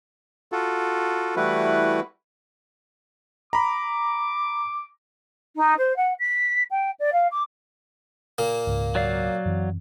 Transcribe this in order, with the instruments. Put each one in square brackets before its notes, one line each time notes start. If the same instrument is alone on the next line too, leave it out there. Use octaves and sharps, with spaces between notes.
[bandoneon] F4 F#4 A4
E3 G3 A3 E4 F#4 B4
[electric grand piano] A#5 B5 [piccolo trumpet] D6
[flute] D#4
C5
F#5
B6
G5
D5
F5
D6
[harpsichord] A#2 A#3
[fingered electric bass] C#2 G#2
[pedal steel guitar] F#3 D5 F5
[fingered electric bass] F#2 E3 C4